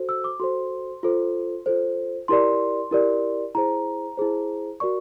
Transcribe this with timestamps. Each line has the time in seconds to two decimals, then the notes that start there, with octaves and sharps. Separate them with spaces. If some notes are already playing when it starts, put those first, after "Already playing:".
Already playing: F#4 A4 C5
0.09 E6
0.24 D6
0.40 F#4 A4 C5 C6
1.03 F4 A4 C5
1.66 F4 A4 C5
2.28 E4 G4 A#4 D5 C6
2.91 E4 G4 A#4 D5
3.55 E4 G#4 C5 A#5
4.17 E4 G#4 C5
4.80 F#4 A#4 D5 C#6